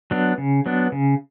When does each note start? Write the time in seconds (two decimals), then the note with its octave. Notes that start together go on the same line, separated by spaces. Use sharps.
0.11 F#3 B3 D4
0.38 C#3
0.66 F#3 B3 D4
0.92 C#3